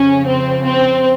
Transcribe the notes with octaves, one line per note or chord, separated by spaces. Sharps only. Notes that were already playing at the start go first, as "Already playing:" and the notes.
Already playing: F2 C#3 C#4
C4
C4